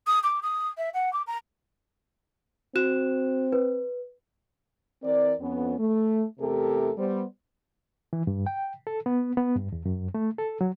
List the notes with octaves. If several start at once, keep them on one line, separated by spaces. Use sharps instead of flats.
D#6
D6
D#6
E5
F#5
D6
A#5
C4 F#4 F#6 E7
B4
E3 C4 A#4 D5
F2 B3 C#4
A3
E2 C3 A3 G4 A4 A#4
G3 B3 C5
E3
G2
G5
A4
B3
B3
G2
E2
F#2
A3
A4
F#3